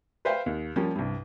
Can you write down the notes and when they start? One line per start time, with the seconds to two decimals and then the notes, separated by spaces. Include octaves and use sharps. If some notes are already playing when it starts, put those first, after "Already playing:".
0.25 B4 C5 E5 F5 G5
0.46 D#2
0.76 F3 G3 A#3 C#4
0.95 C2 G2